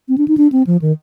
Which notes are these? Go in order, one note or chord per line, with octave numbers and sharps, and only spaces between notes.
C4
D4
D#4
D4
C4
F3
D#3